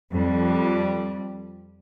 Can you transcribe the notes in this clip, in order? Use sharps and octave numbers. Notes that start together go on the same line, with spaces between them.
F2 G3